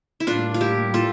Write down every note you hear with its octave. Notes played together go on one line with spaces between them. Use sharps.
E4
A2 G3 A#3 D4 F4
F4
E4 G4
F4 A4